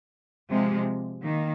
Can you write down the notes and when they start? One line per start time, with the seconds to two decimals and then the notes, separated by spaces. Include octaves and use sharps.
0.51 C3 F3 G#3
1.24 D#3 A#3